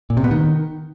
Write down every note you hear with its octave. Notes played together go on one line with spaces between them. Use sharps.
A#2
C3
B3
D#3